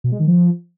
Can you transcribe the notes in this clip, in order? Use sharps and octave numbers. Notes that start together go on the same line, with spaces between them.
B2
G#3
D#3
F3